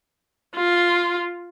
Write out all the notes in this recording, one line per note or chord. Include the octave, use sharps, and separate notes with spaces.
F4